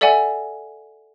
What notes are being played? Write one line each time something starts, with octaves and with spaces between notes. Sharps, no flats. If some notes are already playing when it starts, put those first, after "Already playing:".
A4 D5 E5 F#5 G#5